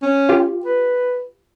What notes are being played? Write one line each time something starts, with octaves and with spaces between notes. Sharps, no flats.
C#4
F4 G4
B4